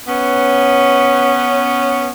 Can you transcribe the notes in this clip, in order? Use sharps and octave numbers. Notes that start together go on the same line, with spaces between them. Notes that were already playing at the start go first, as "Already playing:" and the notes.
B3 C#4